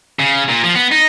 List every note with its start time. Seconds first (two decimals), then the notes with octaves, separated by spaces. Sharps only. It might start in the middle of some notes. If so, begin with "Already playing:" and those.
0.19 C#3
0.49 A#2
0.64 F3
0.75 B3
0.92 D#4